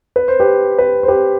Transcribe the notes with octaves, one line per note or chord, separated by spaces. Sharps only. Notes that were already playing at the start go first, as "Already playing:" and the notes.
B4
C5
G4 B4
G4 B4
C5
G4 B4